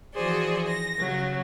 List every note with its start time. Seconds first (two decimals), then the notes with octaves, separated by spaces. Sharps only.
0.14 E3 F3 F#4 G#4 C5 D5
0.66 A#6
0.99 C#3 F#3